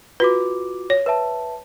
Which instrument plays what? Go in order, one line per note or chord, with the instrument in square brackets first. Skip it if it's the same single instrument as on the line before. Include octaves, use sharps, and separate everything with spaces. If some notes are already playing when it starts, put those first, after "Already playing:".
[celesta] F4 F#4 D6 [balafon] B4
[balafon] C#5
[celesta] B4 E5 A5